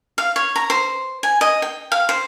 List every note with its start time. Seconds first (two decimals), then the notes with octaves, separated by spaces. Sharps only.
0.18 F5
0.36 C#5
0.56 A#5
0.70 C5
1.23 G#5
1.41 D#5
1.62 G5
1.92 F5
2.09 C5